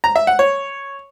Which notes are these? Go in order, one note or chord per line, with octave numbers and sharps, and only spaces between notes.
A#5
E5
F#5
C#5